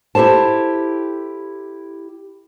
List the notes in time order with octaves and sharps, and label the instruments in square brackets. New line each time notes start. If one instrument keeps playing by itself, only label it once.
[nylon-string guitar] E4 G4 A4 C5 A5